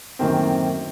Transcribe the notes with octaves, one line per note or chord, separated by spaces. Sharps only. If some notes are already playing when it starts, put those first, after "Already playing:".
F#2 A2 D#3 A#3 C4